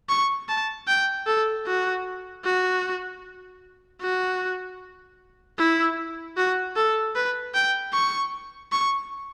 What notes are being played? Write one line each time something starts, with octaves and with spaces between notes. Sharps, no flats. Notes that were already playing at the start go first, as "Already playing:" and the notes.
C#6
A5
G5
A4
F#4
F#4
F#4
E4
F#4
A4
B4
G5
C#6
C#6